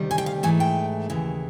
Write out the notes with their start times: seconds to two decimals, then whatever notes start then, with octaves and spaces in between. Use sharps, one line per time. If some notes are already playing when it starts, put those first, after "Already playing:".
Already playing: D2 C3 D#3 G3
0.11 G#5
0.18 G5
0.26 F5
0.43 G#2 E3 A3 G#5
0.60 G5
1.10 D#2 C#3 E3